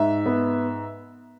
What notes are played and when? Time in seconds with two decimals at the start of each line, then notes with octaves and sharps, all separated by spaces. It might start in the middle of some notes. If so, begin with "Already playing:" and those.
Already playing: G#2 E5
0.26 B3